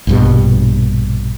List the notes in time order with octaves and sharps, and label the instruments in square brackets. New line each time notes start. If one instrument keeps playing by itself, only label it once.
[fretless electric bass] A#1 G2 B2